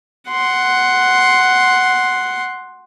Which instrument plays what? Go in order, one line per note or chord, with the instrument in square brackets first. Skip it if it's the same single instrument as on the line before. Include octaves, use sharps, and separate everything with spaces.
[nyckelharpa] F#5 C6